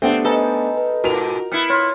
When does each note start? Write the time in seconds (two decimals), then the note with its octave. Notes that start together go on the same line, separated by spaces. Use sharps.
0.02 A3 B3 C4 D4 G4
0.25 D#4 A4 B4 G#5 B5
0.78 B4
1.04 G#2 B2 F4 F#4 A#4 F7
1.52 B3 E4 F6 C#7
1.70 F4 C#5